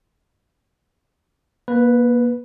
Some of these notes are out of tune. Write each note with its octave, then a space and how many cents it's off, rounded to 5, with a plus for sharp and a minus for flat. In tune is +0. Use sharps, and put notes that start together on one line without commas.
A#3 +35 B4 +0